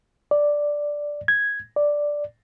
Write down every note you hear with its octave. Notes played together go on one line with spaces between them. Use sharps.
D5
G#6
D5